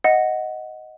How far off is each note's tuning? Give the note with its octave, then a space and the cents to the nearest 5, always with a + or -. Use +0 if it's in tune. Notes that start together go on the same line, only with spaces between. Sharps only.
D#5 +5 F#5 +0